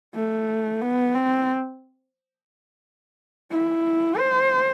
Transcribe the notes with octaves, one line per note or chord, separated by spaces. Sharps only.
A3
B3
C4
E4
C5